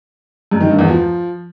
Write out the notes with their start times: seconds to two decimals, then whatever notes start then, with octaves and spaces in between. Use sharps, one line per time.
0.51 F#2
0.61 D#3
0.70 G2
0.79 E2
0.88 F3